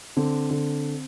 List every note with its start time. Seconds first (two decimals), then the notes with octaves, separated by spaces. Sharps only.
0.17 D3 C4
0.51 D3